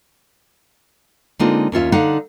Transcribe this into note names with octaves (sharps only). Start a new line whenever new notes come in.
D3 G#3 A#3 C4 D#4 F4
D#2 C#4 F4 E5
D3 D#4 F5 F#5